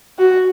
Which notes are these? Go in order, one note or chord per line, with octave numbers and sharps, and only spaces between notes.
F#4